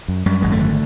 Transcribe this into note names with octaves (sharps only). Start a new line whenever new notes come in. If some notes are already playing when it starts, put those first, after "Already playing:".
F#2
F#2 G3
G#1 G#3
A3
D3